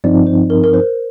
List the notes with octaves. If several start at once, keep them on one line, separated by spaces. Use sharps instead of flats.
G2 F3 C4 D#4 D5
C5
A#4
A#4
C5